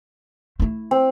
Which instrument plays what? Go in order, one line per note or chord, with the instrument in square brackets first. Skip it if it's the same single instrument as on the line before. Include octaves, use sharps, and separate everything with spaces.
[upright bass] A3 E4
[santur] C4